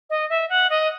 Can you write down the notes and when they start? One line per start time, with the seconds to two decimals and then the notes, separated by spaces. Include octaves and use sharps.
0.10 D#5
0.29 E5
0.49 F#5
0.70 D#5